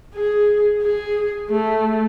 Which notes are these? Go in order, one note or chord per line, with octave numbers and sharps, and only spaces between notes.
G#4
G#4
A3